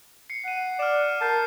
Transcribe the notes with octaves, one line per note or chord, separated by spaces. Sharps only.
C7 C#7
F#5 C7 D#7
D5 F6 E7
A#4 A5 F6 G6 C7